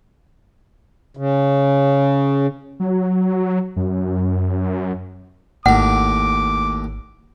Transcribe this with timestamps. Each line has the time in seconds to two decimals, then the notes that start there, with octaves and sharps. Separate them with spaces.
1.17 C#3
2.80 F#3
3.76 F#2
5.66 G#1 D#2 A2 F#5 D6